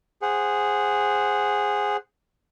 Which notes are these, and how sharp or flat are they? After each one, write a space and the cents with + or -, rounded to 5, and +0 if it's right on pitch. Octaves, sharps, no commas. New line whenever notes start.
G#4 -10 C5 +0 F#5 +0